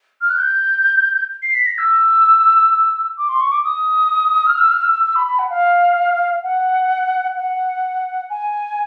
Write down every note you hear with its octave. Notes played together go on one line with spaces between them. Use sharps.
F6
F#6
G6
C7
B6
A#6
E6
D6
C6
C#6
D6
D#6
F6
E6
F6
E6
E6
E6
B5
B5
F#5
F5
F#5
F#5
G#5